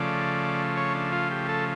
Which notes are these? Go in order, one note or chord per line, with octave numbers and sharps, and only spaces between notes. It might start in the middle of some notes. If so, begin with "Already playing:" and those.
Already playing: C#3 F3 A3 D5
C#5
D4
F4
G4
A4